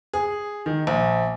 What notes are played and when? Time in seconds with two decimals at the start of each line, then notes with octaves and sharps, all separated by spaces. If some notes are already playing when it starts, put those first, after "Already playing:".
0.14 G#4
0.66 D#3
0.87 A#1